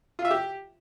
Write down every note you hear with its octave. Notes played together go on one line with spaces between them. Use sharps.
F4
E5
G4